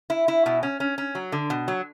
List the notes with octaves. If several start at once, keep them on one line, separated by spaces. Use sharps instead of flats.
E4
E4
B2
C#4
C#4
C#4
F#3
D3
B2
F#3